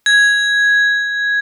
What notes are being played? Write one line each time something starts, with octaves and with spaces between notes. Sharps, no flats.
G#6